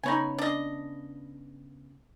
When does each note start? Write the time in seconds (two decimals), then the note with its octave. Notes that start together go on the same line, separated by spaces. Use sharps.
0.03 C#3 B3 D#4 C#5 G#5 B5
0.38 D4 D#5